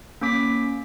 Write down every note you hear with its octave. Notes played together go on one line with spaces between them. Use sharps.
A#3 C#4 D6 B6